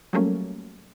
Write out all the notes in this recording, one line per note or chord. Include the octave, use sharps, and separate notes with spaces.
F#3 G3 A3 A#3 C#4